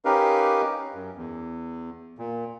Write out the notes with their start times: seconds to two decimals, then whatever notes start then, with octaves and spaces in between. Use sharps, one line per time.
0.05 C#4 D#4 G4 A#4 B4 F5
0.95 F#2
1.17 E2
2.18 A#2